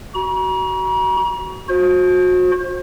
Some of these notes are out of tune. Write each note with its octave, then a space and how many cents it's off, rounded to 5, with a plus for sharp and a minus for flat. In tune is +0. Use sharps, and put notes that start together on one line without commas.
F#4 +25 A#5 +40
F#4 -30 C5 +30